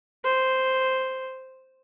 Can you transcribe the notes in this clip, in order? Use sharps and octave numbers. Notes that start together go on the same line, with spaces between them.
C5